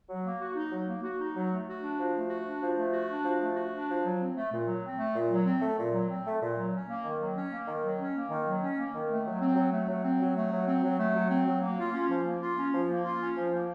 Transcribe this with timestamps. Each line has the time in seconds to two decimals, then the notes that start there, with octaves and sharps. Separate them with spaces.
0.09 F#3
0.24 A#3
0.40 F#4
0.56 D#4
0.71 F#3
0.87 A#3
1.03 F#4
1.19 D#4
1.34 F#3
1.50 A3
1.67 F#4
1.82 D4
1.98 F3
2.14 A3
2.29 F#4
2.45 D4
2.61 F3
2.77 A3
2.92 F#4
3.08 D4
3.24 F3
3.40 A3
3.55 F#4
3.72 D4
3.87 F3
4.03 F#3
4.19 C4
4.35 A3
4.51 A#2
4.67 F#3
4.83 C4
4.98 A3
5.14 A#2
5.30 F#3
5.45 C4
5.61 A3
5.78 A#2
5.93 F#3
6.09 C4
6.25 A3
6.41 A#2
6.57 F#3
6.72 C#4
6.88 A#3
7.04 D#3
7.19 F#3
7.36 C#4
7.52 A#3
7.67 D#3
7.83 F#3
7.98 C#4
8.15 A#3
8.30 D#3
8.46 F#3
8.62 C#4
8.78 A#3
8.93 D#3
9.09 A3
9.25 F#3
9.41 C4
9.56 F#3
9.72 A3
9.88 F#3
10.04 C4
10.20 F#3
10.36 A3
10.51 F#3
10.67 C4
10.82 F#3
10.99 A3
11.15 F#3
11.30 C4
11.46 F#3
11.62 A#3
11.78 F4
11.94 C#4
12.09 F3
12.25 A#3
12.41 F4
12.56 C#4
12.73 F3
12.88 A#3
13.04 F4
13.20 C#4
13.36 F3
13.51 A#3